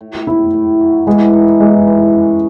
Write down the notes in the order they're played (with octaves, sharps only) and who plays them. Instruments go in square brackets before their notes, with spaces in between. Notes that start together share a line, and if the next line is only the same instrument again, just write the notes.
[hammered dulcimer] A2
[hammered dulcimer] A2 [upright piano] E4
[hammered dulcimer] A2
F#3
[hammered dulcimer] E3 [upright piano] G#3
[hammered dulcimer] D#4
[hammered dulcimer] E3 [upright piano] G#3
[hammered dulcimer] E3
C#4